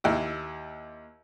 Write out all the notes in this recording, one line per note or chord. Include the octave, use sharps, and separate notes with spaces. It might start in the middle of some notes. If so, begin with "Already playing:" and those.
D#2 E4